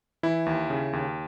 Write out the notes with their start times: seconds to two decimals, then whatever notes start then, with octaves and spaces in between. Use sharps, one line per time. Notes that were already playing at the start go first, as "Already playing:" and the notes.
0.23 E3 E4
0.46 D#2
0.70 C#3
0.93 D#2